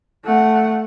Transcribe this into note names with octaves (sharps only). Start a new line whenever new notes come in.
A3 F#5